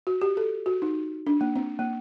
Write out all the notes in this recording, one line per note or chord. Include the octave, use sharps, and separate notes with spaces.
F#4
G4
A4
F#4
D#4
D4
A#3
C4
A#3